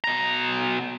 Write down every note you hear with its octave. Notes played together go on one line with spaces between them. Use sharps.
B2 A#5